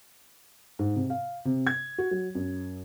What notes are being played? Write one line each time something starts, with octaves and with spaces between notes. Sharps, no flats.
G#2
C3
F5
C3
G#6
F#4
F#3
F#2